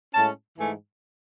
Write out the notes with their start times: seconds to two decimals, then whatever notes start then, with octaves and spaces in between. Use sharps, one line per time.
0.14 A2 G#3 C#4 A5
0.58 G#2 E3 A3 G#5